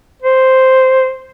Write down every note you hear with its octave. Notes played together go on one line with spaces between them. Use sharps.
C5